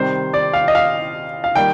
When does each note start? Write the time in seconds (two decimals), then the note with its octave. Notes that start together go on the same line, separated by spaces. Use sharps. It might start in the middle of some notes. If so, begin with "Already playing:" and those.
Already playing: C3 D#3 G3 C5
0.34 D5
0.53 F5
0.68 D#5
0.75 F5
1.44 F5
1.55 D#3 G3 A#3 G5